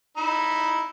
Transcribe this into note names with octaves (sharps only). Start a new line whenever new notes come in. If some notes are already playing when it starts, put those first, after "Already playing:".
D#4 B5 E6